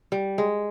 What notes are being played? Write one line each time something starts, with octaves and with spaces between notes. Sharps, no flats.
G3
G#3